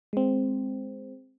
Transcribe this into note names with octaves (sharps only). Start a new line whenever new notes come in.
G#3 C4